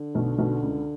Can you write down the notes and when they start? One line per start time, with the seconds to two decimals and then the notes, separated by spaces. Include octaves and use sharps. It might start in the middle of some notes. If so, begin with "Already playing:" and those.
Already playing: D3
0.15 B1 B2
0.38 B1 B2
0.62 C#2 C#3